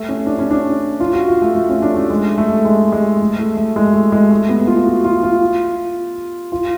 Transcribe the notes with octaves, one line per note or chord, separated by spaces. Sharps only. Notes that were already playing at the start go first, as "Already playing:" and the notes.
Already playing: A3
C#4
D4
C#4
D4
F4
F#4
F4
A3
A3
C#4
D4
A3
G#3
A3
G#3
G#3
A3
A3
A3
G#3
A3
G#3
A3
B3
F4
F#4
F4
F4
F4